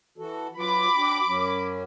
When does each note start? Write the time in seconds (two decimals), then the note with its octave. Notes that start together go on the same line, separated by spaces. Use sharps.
0.18 E3 F#4 A4
0.57 F#3 F4 B4 B5 D6
0.96 D4 F#4 G5
1.27 F#2 F#3 C#4